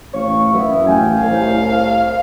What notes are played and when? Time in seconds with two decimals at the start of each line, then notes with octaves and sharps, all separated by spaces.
0.14 A1 F5 C#6
0.54 F#2 B3 E4
0.87 A1 F5 G5 G#5
1.23 C2 A2 F5